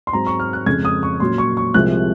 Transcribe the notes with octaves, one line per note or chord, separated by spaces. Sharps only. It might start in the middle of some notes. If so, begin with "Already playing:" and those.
C6
G#2 F#3 C4 A#5
C#6
F6
F#6
F2 C#3 G#3 G#6
D#6
C#6
A#2 F#3 C#4 C6
C#6
C#6
C2 C3 F3 G#3 F#6